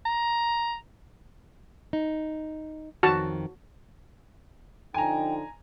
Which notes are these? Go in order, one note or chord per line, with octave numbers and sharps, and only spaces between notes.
A#5
D#4
F2 D#3 F#4 A5
D3 F3 D#4 G5 G#5 A#5